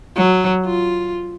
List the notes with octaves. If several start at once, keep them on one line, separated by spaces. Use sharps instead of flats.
F#3
F4